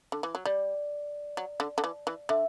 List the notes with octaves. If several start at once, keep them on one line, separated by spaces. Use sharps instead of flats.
D3
E3
F#3
G3 D5
F#3
D3
D3
E3
E3
D3 E5